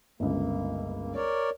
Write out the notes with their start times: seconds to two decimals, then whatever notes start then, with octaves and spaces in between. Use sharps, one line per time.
0.20 G1 C#2 A#3
1.14 A#4 C#5 D5